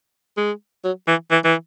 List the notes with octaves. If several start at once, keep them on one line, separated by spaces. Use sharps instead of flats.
G#3
F#3
E3
E3
E3